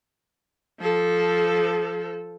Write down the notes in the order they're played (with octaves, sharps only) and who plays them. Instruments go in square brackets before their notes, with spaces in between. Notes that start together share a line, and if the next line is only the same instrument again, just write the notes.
[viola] F3 A4